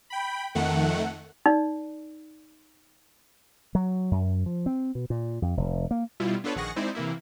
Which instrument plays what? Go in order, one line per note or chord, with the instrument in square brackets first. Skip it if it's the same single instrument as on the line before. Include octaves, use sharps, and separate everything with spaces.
[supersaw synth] G5 B5
F2 D#3 A3 F#5
[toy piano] D#4 D5
[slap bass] F#3
F#2
F3
C4
B2
A#2
F2
F1
A#3
[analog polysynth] B2 G3 E4 F4
B3 D4 F4 A4 B4 C#5
A#1 D#3 G#4 F#5 C#6 A#6
G#3 C4 D#4 E4 C5 D5
C3 E3 A#3 E4